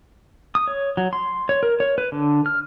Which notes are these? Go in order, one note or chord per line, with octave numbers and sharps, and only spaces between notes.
D#6
C#5
F#3
C6
C#5
A#4
C#5
B4
D3
F6